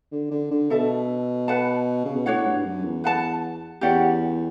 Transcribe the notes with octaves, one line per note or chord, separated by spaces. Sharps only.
D3
D3
D3
B2 A4 E5 A5
B4 F#5 A5
C#3
B2
A2 D4 F#4 C#5 F#5
G2
F#2
E2
B4 F#5 A5
E2 C#4 G4 D5 F#5